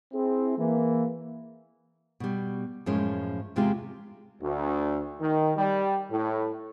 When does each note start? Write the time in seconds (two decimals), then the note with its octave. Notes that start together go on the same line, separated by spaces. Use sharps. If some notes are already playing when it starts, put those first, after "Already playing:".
0.12 C4 E4 G#4
0.57 E3 A#3
2.20 B2 G3
2.86 F#2 A2 F3 G#3 C#4
3.56 E2 C3 G#3 F4 G4
4.42 D2
5.21 D#3
5.57 G3
6.10 A2